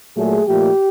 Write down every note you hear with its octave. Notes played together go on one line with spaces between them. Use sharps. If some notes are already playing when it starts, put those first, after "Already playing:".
A#2 F#3 A3 G#4
A#2 F3 A3 G4